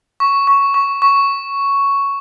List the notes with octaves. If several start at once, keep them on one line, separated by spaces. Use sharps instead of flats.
C#6
C#6
C#6
C#6